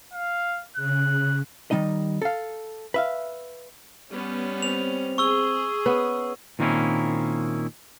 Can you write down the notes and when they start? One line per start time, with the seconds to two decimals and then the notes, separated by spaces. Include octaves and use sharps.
0.13 F5
0.77 C#3 F#6
1.71 D#3 G3 D#4 D#5
2.22 A4 F5
2.94 B4 E5 F5
4.10 G3 B3 C#4
4.62 C4 F7
5.18 G#4 C#6 E6 G7
5.86 B3 C#4
6.59 A#2 D#3 A#3 C4 C#4 E4